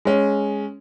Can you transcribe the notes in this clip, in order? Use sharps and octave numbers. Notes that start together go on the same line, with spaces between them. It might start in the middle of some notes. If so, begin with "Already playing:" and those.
G#3 C#4